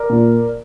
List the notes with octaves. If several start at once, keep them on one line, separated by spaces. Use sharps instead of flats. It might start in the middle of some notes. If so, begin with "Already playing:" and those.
Already playing: A#4 D5
A#2